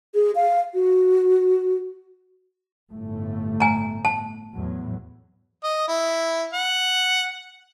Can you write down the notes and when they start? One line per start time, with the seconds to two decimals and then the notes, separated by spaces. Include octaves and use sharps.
0.15 G#4
0.35 F5
0.74 F#4
2.91 G1 A2 A3
3.60 G#5 A#5
4.05 A5
4.54 E2 A2 F#3
5.64 D#5
5.88 E4
6.53 F#5